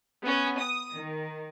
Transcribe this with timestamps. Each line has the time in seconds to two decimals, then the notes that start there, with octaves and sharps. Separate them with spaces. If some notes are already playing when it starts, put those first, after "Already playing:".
0.22 B3 C#4
0.60 D#6
0.92 D#3